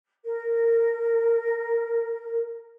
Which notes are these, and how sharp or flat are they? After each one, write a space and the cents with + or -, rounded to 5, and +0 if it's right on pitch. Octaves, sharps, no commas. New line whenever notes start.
A#4 -15